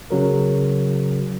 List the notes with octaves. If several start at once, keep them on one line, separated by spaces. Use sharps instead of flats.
C#3 F#3 A#4